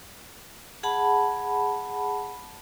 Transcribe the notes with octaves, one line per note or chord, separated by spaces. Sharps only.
G#4 F#5 A5 B5